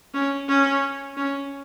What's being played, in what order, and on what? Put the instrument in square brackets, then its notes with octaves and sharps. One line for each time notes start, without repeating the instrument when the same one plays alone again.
[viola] C#4
C#4
C#4